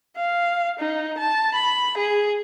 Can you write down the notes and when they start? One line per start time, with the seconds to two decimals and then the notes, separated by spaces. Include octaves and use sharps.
0.16 F5
0.79 D#4
1.18 A5
1.54 B5
1.97 G#4